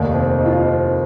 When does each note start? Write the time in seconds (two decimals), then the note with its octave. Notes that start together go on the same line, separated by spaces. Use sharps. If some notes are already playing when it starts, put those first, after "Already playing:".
Already playing: F1 D#2 D#3
0.14 C4
0.39 D#4
0.45 F4
0.52 D#4
0.64 C4